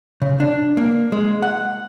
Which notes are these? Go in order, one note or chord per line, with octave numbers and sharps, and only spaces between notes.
C#3
D4
A#3
G#3
F#5